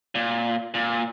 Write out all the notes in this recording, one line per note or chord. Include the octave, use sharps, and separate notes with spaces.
A#2
A#2